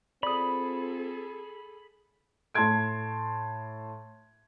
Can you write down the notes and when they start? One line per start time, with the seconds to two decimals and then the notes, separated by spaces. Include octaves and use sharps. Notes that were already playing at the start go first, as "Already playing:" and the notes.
0.23 C4 F4 G#4 A4 D5 B5 D#6
2.54 A2 A5 C6 G#6 D7